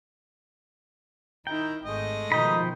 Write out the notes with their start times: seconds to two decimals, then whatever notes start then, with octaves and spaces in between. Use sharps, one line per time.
1.47 D#3 D#4 E4 G5 A#5
1.85 G#1 G#3 A3 D#5
2.32 B2 D#3 F3 D#4 G5 B5